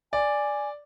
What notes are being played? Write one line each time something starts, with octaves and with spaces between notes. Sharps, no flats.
D5 G#5